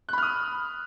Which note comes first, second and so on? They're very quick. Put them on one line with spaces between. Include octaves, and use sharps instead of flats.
F#6 B5 F6 D#6